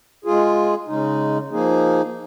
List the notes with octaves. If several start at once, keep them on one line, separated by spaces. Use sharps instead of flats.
G#3 F4 G#4
C#3 G#3 D#4
F3 A#3 D#4 G#4